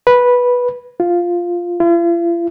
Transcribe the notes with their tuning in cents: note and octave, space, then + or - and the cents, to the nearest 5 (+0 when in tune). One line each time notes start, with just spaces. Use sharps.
B4 -10
F4 +0
F4 -45